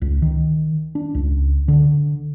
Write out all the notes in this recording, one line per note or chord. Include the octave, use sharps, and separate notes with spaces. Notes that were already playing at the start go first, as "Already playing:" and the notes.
C#2
D#3
D4
C#2
D3